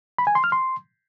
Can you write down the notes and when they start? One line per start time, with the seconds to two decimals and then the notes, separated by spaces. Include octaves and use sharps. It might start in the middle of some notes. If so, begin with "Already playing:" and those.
0.19 B5
0.27 G#5
0.35 C6
0.44 F6
0.52 C6